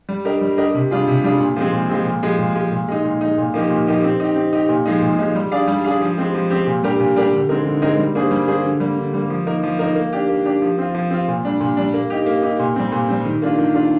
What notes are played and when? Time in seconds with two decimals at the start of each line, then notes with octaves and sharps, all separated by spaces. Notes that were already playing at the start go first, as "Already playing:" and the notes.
0.09 G3
0.25 D4 G4 A#4 D#5
0.41 G3
0.57 D4 G4 A#4 D#5
0.74 C3
0.91 G3 D4 F4 G#4
1.08 C3
1.24 G3 D4 F4 G#4
1.40 A#2
1.56 F3 G#3 C4
1.73 A#2
1.89 F3 G#3 C4
2.06 A#2
2.23 F3 G#3
2.39 A#2
2.55 F3 G#3
2.72 A#2
2.88 G#3 D#4
3.05 A#2
3.21 G#3 D#4
3.38 A#2
3.54 F3 A#3 D#4 G4
3.70 A#2
3.87 F3 A#3 D#4 G4
4.04 C4
4.20 D#4 G4
4.36 C4
4.53 D#4 G4
4.69 A#2
4.86 F3 G#3 D#4
5.02 A#2
5.19 F3 G#3 D#4
5.35 G3
5.52 D4 G#4 D5 F5
5.67 G3
5.85 D4 G#4 D5 F5
6.01 F3
6.18 G#3 C4 G4
6.34 F3
6.50 G#3 C4 G4
6.67 A#2
6.83 G3 D4 G4 A#4
7.00 A#2
7.16 G3 D4 G4 A#4
7.33 D3
7.49 G#3 C4 D#4 A#4
7.65 D3
7.82 G#3 C4 D#4 A#4
7.98 G3
8.15 A#3 D4 G#4 C5
8.31 G3
8.48 A#3 D4 G#4 C5
8.65 D3
8.80 G3 A#3
8.97 D3
9.14 G3 A#3
9.30 F3
9.46 A#3 D#4 A#4
9.63 F3
9.79 A#3 D#4 A#4
9.95 A#3
10.13 D4 G4
10.29 A#3
10.46 D4 G4
10.62 F3
10.78 C4 F4
10.94 F3
11.11 C4 F4
11.28 A#2
11.45 G3 D4
11.60 A#2
11.77 G3 D4
11.94 A#3
12.10 D#4 G4
12.26 A#3
12.43 D#4 G4
12.59 A#2
12.76 G3 C4
12.92 A#2
13.09 G3 C4
13.25 D#3
13.42 A#3 D4 F4
13.58 D#3
13.74 A#3 D4 F4